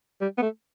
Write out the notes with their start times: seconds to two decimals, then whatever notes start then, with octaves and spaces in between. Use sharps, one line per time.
0.21 G3
0.38 B3
0.42 A3